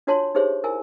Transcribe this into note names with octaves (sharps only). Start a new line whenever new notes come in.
D4 F4 F#4 C#5 A5 C6
D#4 G4 G#4 C5 C#5 E5
E4 A#4 E5 G#5